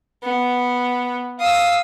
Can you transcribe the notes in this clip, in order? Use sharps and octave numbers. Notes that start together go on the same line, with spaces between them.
B3
F5 D#6 E6